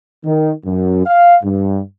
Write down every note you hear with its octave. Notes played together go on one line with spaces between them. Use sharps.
D#3
F#2
F5
G2